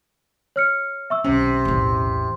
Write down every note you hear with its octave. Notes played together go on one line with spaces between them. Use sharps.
C#5 F6 C#7
E5 C#6 E6
B1 C3 C#4
A1 E2